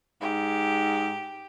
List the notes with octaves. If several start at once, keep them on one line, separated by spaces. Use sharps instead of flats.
G#2 G4